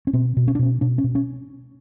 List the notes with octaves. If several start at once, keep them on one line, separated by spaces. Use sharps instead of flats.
C#4
B2 C4
B2
C#4
D4
B2 C#4
B2 D4
C#4
B2
C#4